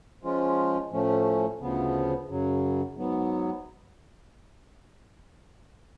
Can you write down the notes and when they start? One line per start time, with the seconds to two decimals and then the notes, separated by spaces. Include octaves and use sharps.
0.23 F3 G#3 C#4 F4
0.91 A2 F3 A3 C#4
1.60 D2 C#3 F3 B3
2.28 F#2 C#3 F#3
2.96 G#2 F#3 B3